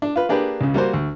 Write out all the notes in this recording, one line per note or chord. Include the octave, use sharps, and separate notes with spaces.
D4
F4 B4
A#3 D4 G4 G#4 B4
C#2 C#3
G3 A#3 F#4 C5
D2